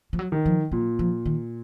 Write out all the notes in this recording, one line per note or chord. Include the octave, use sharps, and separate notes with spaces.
F3
F#3
D#3
F3
A#2 F#3
F3
D#3